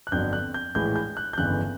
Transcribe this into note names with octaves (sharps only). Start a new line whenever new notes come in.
F#6
G1 F2 D3 F#3 G6
F#6
G6
A#1 A2 E3 G#3 G6
G6
F#6
G6
G1 F2 C#3 E3 F#6